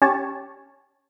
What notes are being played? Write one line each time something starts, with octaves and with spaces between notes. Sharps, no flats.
C#4 G4 C#5 A5